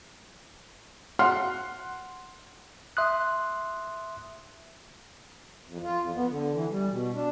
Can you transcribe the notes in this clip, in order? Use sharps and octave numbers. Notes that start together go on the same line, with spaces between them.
F#5 C6 F6 C7
E5 C6 D#6 F#6
F2
F4
F2
B3
D3
E3
G3
B2
D4